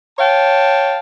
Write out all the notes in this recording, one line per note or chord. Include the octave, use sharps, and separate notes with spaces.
C#5 F5 G5 A5